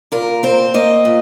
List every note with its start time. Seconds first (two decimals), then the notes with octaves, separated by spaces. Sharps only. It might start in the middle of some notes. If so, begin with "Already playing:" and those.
0.12 A#2 A#4
0.43 C4 C5
0.74 A#3 D#5
1.05 A#2